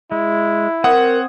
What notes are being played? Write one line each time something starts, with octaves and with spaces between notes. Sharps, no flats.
G#3 E4
C4 A#4 C5 C#5 F#5 D#6